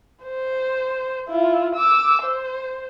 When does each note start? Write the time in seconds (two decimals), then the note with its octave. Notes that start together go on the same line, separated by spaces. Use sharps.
0.23 C5
1.29 E4 F4
1.75 D6 E6
2.23 C5